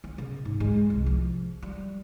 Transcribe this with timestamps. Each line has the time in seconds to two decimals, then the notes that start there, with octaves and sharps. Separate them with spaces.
0.04 B3
0.18 C#3
0.45 G#2
0.60 G#3
0.90 C2
1.06 F3
1.62 G3